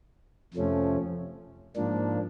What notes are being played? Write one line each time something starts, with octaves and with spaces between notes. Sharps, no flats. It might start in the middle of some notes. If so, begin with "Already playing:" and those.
F2 C3 F3 A3 C#4
G#2 F3 A#3 D4